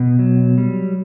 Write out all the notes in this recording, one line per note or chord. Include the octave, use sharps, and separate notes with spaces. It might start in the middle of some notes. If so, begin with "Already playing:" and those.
Already playing: B2
F#3
G3